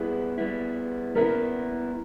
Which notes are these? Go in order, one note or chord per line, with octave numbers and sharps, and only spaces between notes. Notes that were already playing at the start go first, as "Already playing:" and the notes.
Already playing: G3 B3 E4 G#4
G3 B3 E4
G3 B3 E4 A#4